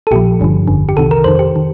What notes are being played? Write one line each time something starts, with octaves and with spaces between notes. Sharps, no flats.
A4
A#1 A#2 F3 G4
G1 G2 D3 F3
G1 F2 D3
G4
C2 C3 D#3 A4
A#4
F2 D#3 C5
G4
D#3